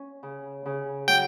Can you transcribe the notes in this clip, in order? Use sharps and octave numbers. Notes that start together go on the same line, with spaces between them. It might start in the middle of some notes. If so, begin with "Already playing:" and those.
Already playing: C#4
C#3
C#3
F#3 G5